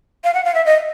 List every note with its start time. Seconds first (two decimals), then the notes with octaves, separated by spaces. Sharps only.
0.24 F5
0.34 F#5
0.45 F5
0.55 E5
0.66 D#5